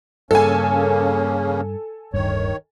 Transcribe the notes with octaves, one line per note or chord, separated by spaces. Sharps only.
G2 C#3 A#3 C#4 A4 G#5
D1 G#1 G2 D#3 C#5